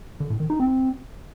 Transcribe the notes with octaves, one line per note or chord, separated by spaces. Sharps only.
D3
A2
D#3
D#4
C4